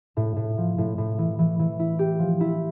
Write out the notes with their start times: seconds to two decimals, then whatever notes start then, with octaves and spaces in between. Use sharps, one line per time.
0.17 A2
0.36 A2
0.58 F3
0.78 A2
0.98 A2
1.18 E3
1.39 E3
1.59 E3
1.79 E4
1.99 G4
2.19 F3
2.40 E4